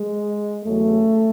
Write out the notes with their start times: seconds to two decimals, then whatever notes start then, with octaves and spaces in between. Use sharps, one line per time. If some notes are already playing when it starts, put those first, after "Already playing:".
Already playing: G#3
0.64 E2 C#3 F#3 A3